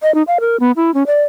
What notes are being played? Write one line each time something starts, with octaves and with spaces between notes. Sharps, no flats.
D#5
D#4
F5
A#4
B3
E4
C#4
D5